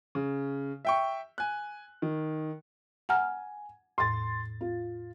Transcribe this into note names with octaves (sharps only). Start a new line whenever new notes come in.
C#3
E5 G5 C#6
G#5 F#6
D#3
F#5 G#5 A#5 F6
E2 A2 C6 A6
F4